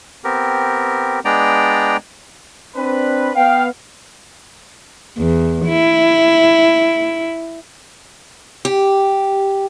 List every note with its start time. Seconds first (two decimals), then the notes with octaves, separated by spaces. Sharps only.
0.24 B3 C4 G4 A#4
1.25 G#3 B3 D4 D5 G5 A#5
2.76 C4 D4 B4
3.35 B3 F5 G5
5.19 E2
5.67 E4
8.65 G4